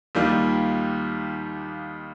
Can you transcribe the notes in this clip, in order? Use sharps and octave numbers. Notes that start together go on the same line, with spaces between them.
D#2 D#3 G3 A#3 F4